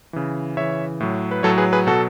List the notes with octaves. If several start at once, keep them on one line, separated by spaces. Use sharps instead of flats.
C#3 E3
C#3 E3 C#5 E5
A2 F#3
B4
A2 F#3 A4 C#5
G#4 B4
G#4 B4
B2 F#3 F#4 A4